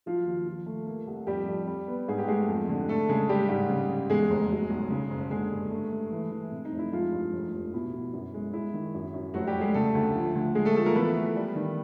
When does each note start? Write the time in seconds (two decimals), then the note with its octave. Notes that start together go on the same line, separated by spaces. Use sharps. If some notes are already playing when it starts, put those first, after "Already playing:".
0.06 F3 F#3 F4
0.26 D#2
0.46 F3
0.66 A3
0.86 A#3
1.07 C2
1.27 F2 G3 G4
1.48 F2
1.67 G3
1.88 B3
2.08 G#2 G#4
2.18 G4
2.28 G#3 A3 G#4
2.48 F2
2.69 D3
2.89 A3 A4
3.09 C#3 G#3 G#4
3.29 G3 G#3 G4
3.49 G#2
3.69 C#3
3.89 C#3
4.10 E2 G#3 G#4
4.30 F1
4.51 F#3
4.70 B1
4.90 C#3
5.10 F#1
5.31 D3 G#3 G#4
5.51 G2
5.71 A3
5.92 A3
6.12 E3
6.31 E3
6.52 C3
6.65 D#4
6.72 F1
6.79 E4
6.93 F3 G#3 F4
7.12 G2
7.33 F1
7.53 F1
7.73 B2 E4
7.94 B2
8.13 F#2
8.34 G#3
8.53 G#3 E4
8.74 D#3
8.94 F#2
9.14 F#2
9.34 F1 F#3 F#4
9.47 G3 G4
9.54 F1
9.61 G#3 G#4
9.74 C#3 A3 A4
9.95 D2
10.15 F3
10.35 D2
10.55 G#3 G#4
10.65 A3 A4
10.76 F3 A3 A4
10.86 A#3 A#4
10.95 E3 B3 B4
11.16 A3
11.36 G3
11.56 D#3